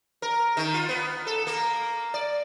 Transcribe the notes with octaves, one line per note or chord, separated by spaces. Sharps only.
A#4
D#3
F4
B3
A4
A#3
D5